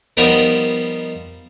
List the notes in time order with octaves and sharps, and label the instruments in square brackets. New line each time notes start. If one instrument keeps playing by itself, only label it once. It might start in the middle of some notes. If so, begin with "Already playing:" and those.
[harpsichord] F3 G3 B3 D#4 A#4